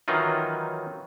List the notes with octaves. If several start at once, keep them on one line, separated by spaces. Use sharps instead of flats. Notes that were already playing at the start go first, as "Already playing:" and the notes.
D#3 E3 F#3 D#4 F4